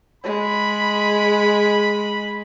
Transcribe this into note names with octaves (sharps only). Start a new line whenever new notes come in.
G#3 B5